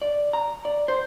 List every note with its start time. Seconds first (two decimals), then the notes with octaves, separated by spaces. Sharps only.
0.02 D5
0.33 A#5
0.65 D5
0.88 C5